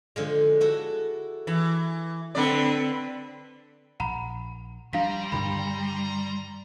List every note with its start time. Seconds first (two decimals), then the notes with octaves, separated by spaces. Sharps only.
0.16 D3 F3 G#3
0.61 E4 F#4 A4
1.47 E3 A5 B5
2.35 D3 C4 B4 D5
4.00 A#1 F#5 A#5 B5
4.93 F3 G3 D4 F5 A#5 C6 B6
5.32 G2 D3 D#3 B5